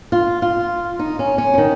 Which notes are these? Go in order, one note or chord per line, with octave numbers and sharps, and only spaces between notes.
F4
F4
D#4
C#4
C#4
F3
D#3